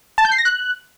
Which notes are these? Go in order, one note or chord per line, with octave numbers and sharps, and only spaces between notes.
A5
G6
C7
A#6
F#6